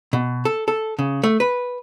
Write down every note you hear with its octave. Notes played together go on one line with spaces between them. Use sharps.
B2
A4
A4
C#3
A3
B4